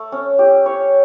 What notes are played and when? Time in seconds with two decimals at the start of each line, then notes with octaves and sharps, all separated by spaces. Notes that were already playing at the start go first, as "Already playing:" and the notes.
Already playing: A3
0.12 C#4
0.39 G4
0.66 C#5